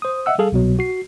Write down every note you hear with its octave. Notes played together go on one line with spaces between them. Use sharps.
C5 D#6
D#5 E5 F#5 E6
G3 G#4 A4 F5
C2 B2 F#3
F#4 C7